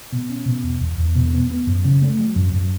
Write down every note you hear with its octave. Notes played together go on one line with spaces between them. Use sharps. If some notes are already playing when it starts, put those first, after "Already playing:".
B2
C#4
B2
E2
E2
E2
B2
B3
B3
F#2
C#3
A3
F#3
F#2
F#2